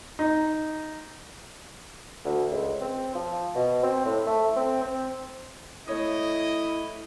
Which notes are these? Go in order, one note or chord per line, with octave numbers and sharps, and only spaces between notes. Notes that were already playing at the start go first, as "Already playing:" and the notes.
D#4
D2
C#2
C4
F3
B2
C4
A2
A3
C4
C4
A3 E4 C#5 D#5 D#6